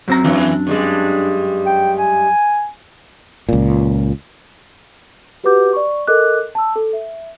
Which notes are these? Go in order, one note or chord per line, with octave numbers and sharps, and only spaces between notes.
F#2 C4 A#5
E2 E3 D4
G2 G3 G#3
G5
G#5
C#2 A#2
F#4 G4 B4 F#5 D6 G6
D5 C#6
A4 A#4 D#5 D6 F#6
A5 E6
A4
E5